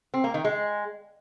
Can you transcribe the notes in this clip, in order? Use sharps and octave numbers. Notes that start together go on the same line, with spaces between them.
C4
A#3
D#3
G#3